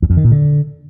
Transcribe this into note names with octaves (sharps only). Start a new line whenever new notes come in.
E2
F2
D#3
A#2
D3